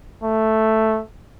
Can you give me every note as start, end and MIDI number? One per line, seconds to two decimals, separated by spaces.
0.23 1.01 57